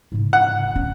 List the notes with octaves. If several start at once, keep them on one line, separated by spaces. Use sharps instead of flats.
G#2 C#3
F#5
D3
C#4